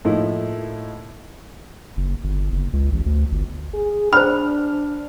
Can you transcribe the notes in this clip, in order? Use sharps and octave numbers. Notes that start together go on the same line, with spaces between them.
A2 F3 A#3 D#4 E4
F#1
G1
F#1
C#2
A1
D2
G1
G#4
D4 C5 B5 F6